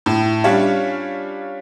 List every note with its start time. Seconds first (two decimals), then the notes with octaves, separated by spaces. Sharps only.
0.06 A2
0.44 G3 C#4 D4 F4 C#5